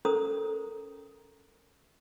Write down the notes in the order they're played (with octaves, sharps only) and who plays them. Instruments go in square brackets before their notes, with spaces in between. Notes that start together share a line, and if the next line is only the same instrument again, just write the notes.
[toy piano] C#4 A4 A#4 C5 A#5 D#6